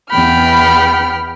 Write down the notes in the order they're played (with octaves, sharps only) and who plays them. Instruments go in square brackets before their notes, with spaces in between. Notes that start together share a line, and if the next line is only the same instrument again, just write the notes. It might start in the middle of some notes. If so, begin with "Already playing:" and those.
[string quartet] E2 B3 G5 B5 F6